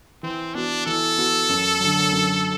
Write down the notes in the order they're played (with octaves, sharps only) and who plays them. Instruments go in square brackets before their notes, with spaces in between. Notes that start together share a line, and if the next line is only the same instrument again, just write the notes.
[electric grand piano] E3 [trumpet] C4
[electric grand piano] B3 F#4 [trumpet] D4
[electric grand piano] E3 [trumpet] A4
[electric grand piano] B3 F#4
F#2
D3 F#3
F#2